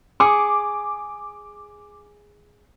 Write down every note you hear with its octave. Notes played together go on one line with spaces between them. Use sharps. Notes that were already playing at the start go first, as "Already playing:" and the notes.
G#4 C#6 D6